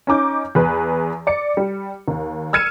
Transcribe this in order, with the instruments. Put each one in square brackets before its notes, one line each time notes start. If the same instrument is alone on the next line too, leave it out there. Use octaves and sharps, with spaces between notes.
[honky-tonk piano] C#4 D#4 D6 G6
E2 B4
D5 C#7
G3
D#2
E6 F6 G#6 C#7 D#7 E7